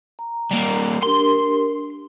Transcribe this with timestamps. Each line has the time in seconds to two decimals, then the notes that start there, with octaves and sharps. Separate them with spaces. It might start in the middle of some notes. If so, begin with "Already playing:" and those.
0.19 A#5
0.51 G3 A#3
1.03 D4 G4 A#4 C6